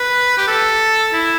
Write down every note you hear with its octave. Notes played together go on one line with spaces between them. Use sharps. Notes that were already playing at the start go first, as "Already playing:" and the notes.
Already playing: B4
G4
A4
E4